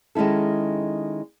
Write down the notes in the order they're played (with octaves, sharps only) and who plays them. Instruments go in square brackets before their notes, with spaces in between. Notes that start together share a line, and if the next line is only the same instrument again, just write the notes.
[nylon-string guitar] D#3 G#3 C#4 E4 A4